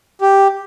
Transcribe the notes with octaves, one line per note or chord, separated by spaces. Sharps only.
G4